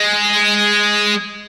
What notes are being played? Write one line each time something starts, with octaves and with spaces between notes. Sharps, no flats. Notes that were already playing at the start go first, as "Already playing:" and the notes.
Already playing: G#3